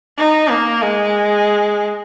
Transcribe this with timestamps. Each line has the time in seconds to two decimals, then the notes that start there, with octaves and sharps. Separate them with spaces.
0.18 D#4
0.50 A#3
0.83 G#3